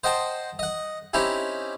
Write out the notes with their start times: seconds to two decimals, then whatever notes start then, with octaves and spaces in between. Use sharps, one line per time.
0.04 C5 D#5 F#5 G5 A5
0.59 D#5 F#5
1.13 C4 C#4 D#4 E4 G4